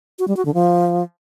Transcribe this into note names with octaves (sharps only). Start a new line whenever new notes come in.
F#4
G3
F#4
D3
F3